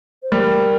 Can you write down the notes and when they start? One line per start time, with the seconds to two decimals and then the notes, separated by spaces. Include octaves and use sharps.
0.23 C5
0.32 G3 A#4